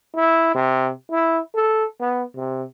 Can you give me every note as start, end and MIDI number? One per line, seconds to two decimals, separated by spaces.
0.15 0.53 64
0.55 0.91 48
1.11 1.40 64
1.55 1.85 69
2.00 2.23 59
2.36 2.64 48